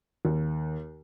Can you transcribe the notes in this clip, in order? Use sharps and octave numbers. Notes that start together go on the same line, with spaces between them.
D#2